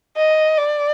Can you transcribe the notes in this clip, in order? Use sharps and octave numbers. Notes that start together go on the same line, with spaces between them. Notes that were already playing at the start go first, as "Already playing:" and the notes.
D#5
D5